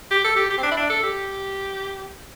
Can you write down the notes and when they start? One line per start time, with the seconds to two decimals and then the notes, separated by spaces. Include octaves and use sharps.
0.11 G4
0.24 A4
0.36 G4
0.50 G4
0.58 C4
0.63 D4
0.71 E4
0.77 D4
0.90 A4
1.03 G4